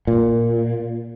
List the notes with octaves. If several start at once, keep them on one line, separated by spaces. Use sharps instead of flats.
A#2